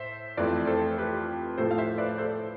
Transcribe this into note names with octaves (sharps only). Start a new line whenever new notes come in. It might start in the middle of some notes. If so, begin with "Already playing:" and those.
Already playing: A2 C5 E5
F2 E3 A3 B4 D5
A4 C5
G4 B4
A2 F3 A3 A4 C5
F5
C5 E5
B4 D5
A4 C5